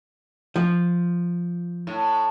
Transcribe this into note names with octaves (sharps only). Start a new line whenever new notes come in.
F3
A2